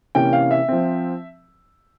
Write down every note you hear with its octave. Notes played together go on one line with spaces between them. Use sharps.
C3 E3 A#3 C#4 G5
F5
E5
F3 C4